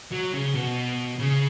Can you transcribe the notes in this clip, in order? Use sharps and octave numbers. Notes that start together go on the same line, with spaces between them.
F#3
C#3
B2
C#3